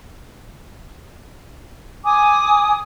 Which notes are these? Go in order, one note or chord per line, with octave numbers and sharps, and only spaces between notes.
G#5 D6 D#6